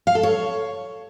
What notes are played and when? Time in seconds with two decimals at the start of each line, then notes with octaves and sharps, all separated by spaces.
0.07 F5
0.15 A4
0.23 C#5